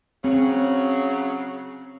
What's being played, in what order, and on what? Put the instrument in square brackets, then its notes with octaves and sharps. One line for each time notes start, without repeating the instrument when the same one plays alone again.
[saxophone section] C#3 F#3 [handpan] C4